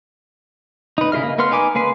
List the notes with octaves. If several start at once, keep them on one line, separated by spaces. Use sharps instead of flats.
D#4 B4
C#3 E4 G#4 D#5 F6
A#3
A#3 B3 B4 C6 F6
D#4 B4 G#5 D6
C#3 A#3 B4 G#5 C6